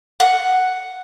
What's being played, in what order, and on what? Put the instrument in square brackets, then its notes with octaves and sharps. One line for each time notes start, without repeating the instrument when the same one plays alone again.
[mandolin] F#5